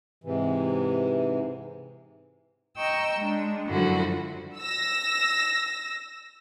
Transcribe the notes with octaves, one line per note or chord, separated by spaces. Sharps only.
G#2 C3 E3
D#5 G5 A#5 C#6 E6
G#3 D4
F#2 D3 F3 G3 E4 F#4
E6 A#6